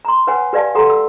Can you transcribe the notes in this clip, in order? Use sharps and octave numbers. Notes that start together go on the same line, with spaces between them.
A#5 C6
B4 C#5 F#5 G#5
G4 B4 D5 F5 G#5 A5
G4 A4 F#5 A#5 C6
E6